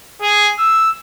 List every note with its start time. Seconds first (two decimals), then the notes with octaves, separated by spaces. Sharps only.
0.22 G#4
0.59 E6